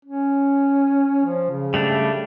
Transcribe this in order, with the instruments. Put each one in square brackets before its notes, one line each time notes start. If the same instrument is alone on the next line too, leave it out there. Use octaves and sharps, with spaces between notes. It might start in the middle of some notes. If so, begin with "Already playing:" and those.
[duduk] C#4
F3
C#3
[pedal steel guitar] G3 A3 D4